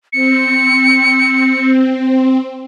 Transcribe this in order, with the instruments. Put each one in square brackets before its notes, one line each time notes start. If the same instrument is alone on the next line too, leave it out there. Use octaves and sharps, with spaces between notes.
[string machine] C4 [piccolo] C#7